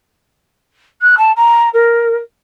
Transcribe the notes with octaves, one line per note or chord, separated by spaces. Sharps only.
F#6
A5
A#5
A#4